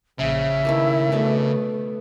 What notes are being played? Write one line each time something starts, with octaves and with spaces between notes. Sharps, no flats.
A#1 C#3 E5
D#3 A3 A#3 E4
B2 A3 D4 C#5